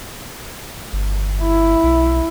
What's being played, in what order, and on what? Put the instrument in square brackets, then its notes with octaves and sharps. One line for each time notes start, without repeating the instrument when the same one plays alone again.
[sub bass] G1
[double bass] E4
[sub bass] B1